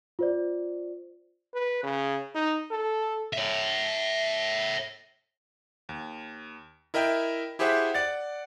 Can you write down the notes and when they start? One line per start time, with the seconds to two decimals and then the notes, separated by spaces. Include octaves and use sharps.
0.19 F4 C5 D5
1.54 B4
1.83 C#3
2.35 D#4
2.71 A4
3.33 C#5 E5
5.89 D#2
6.94 E4 A#4 D#5 E5 G5
7.59 E4 G4 G#4 C5 E5 F#5
7.94 D5 F#5 A6